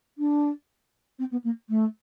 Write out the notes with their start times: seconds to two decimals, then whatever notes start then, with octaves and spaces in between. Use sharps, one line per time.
0.18 D4
1.19 C4
1.31 B3
1.44 A#3
1.69 A3